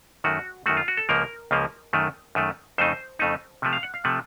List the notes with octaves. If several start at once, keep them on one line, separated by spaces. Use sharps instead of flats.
F#2 D#3 A3 F#4
F#2 D#3 A3 F#4
F4
F#4
A4
C#2 C#3 F3 A#3 A#4
C#2 C#3 F3 A#3
F#2 D#3 A3
F#2 D#3 A3
F2 C#3 A3 D#4 C5
F2 C#3 A3 D#4
C3 F3 A3
F5
F#5
F5
C3 F3 A3 F#5